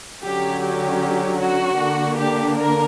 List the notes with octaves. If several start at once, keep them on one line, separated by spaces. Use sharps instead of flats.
D3 F#3 C#4 G4
G4
F#4
D3 A#3 D4
G4
A#4